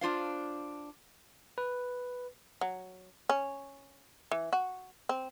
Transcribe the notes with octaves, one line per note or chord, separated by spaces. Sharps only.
D4 F4 C5 F5
B4
F#3
C#4
E3
F#4
C4